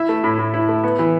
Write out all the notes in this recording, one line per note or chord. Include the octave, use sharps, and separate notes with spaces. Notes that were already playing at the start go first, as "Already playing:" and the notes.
Already playing: E4 E5
A3
A2
A2
E4
A3
B3
E3